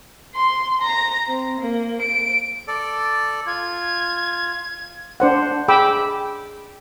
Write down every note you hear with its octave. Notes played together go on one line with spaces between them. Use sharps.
C6
A#5
C4
A#3
D7
A4 D5
F4 G#6
D4 C5 F#5
G#4 G5 B5 D6 E6